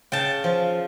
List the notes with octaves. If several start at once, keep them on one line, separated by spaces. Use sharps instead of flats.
C#3 G5 A5
F3